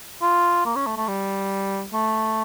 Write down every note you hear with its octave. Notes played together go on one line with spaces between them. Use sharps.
F4
A#3
C#4
A3
A3
G3
A3